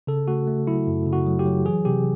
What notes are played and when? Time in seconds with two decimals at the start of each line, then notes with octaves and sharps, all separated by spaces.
0.07 C#3 A4
0.28 A3 F#4
0.47 A3
0.67 F#3 E4
0.87 F#2
1.06 C#3
1.13 F#4
1.26 F#3
1.39 G4
1.46 F#3
1.66 E3 G#4
1.85 C3 G4